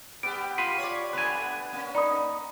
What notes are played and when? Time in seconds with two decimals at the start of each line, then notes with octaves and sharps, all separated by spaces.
0.23 G3 B3 G4 D7
0.58 F4 B5 C6 D#7
0.78 C#5 D5
1.13 A3 B3 D4 B4 G#5
1.73 A#3 C#4
1.95 D#4 D5 B5 D#6